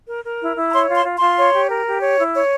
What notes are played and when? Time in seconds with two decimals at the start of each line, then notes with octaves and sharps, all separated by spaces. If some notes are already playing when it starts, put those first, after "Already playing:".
0.08 A#4
0.25 A#4
0.41 E4
0.56 E4
0.68 A#5
0.73 C#5 C6
0.89 F4
0.94 C6
1.05 F4
1.16 F4 C6
1.37 C#5
1.53 G4
1.69 A#4
1.86 G4
2.01 C#5
2.18 E4
2.34 C#5